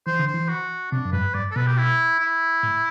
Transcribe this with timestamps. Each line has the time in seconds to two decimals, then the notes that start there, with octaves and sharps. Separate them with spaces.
0.07 E3 C5
0.19 D3
0.27 C5
0.34 E3
0.49 F#4
0.92 C3 D4
1.05 F#2
1.13 G2 B4
1.34 G2 D5
1.51 A4
1.56 B2 B4
1.67 G4
1.78 E4
2.20 E4
2.63 A2